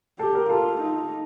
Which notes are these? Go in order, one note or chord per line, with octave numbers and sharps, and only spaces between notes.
G4 A4
A#4
F4 A4
D#4